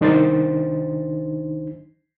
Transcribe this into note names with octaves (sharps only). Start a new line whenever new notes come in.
C2 D#3 D4 D#4 C5 A6